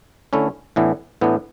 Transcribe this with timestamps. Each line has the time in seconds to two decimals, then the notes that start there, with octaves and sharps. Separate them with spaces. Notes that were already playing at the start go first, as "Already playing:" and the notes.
0.33 D3 A3 C#4 E4
0.76 A2 E3 B3 D4
1.21 A2 E3 B3 D4